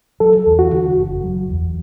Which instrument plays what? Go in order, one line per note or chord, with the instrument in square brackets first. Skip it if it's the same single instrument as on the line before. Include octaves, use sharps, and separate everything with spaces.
[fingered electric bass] F#3 [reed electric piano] A4
[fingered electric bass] E2
[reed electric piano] F#4
[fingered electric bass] D3
F#1
F#3
E2